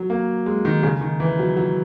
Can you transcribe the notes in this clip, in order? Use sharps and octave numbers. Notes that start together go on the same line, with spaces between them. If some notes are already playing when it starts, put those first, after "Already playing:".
Already playing: F#3
A#3
G#3
D#3
C#3
D#3
E3
F#3
F#3